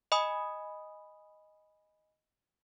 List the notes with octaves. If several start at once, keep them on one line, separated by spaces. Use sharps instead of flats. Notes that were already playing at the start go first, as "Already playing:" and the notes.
D#5 G#5 B5 D#6